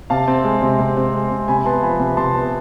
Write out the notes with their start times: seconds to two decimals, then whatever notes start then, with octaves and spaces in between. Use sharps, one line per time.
0.10 C3 F5 A5
0.28 C4
0.44 G#3
0.62 C3
0.79 C3
0.97 C4
1.14 G#3
1.30 C3
1.48 C3 G#5 B5
1.66 B3 A5 C6
1.82 F3 G#5 B5
2.00 C3
2.17 C3 A5 C6
2.35 B3